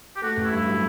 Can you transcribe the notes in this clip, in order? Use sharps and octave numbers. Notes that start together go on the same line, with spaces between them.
G4
A3 F#4
A1
E4
G2
F#3